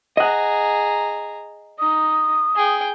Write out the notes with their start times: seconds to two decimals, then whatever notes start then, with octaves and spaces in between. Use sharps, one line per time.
0.17 G#4 D#5 F#5 A#5
1.79 D#4 D#6
2.56 G#4 G5